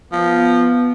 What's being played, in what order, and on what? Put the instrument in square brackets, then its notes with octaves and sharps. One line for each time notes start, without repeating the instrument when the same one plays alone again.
[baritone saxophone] F3 [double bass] B3